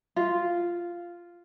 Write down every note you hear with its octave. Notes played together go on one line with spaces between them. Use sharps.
F4